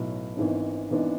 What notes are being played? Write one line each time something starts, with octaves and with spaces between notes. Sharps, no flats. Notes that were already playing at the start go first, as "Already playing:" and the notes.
Already playing: B1 A2 F#3 B3
G#1 G#2 E3 B3 D4
G#1 G#2 E3 B3 D4